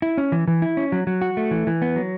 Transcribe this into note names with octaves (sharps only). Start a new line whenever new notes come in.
E4
C#4
E3
E3
E4
C#4
F#3
F#3
F#4
A3
E3
E3
B3
F#3